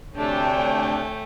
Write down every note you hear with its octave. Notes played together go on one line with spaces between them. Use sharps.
D2 C3 A3 D4 C#5 G5 G#5